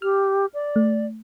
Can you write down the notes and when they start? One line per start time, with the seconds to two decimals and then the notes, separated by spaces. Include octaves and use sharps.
0.02 G4 F6
0.54 D5
0.76 A3